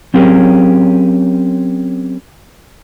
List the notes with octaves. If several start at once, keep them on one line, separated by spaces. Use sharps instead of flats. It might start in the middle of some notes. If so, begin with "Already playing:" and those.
F#3 C4 C#4 G4 G#4 A#4